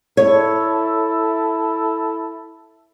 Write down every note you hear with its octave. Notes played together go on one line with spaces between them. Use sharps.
E4 A4 C#5